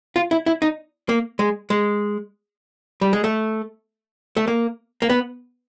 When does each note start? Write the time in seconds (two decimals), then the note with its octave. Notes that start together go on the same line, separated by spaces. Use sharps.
0.16 F4
0.31 E4
0.46 E4
0.62 D#4
1.09 A#3
1.39 G#3
1.70 G#3
3.01 G3
3.13 G#3
3.24 A3
4.37 A3
4.48 A#3
5.02 A#3
5.10 B3